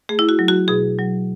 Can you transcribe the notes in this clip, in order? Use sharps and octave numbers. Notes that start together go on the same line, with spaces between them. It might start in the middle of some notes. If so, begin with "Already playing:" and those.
A3 G#4
E4
F#4
F#3
F#4
B2 G#4
F#3